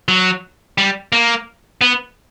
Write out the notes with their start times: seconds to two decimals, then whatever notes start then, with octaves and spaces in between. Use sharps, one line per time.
0.08 F#3
0.78 G3
1.13 A#3
1.81 B3